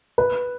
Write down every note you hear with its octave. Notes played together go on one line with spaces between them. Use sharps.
B4